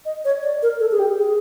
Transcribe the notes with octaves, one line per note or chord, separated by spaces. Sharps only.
D#5
C#5
D5
A#4
A4
G#4
G4
G#4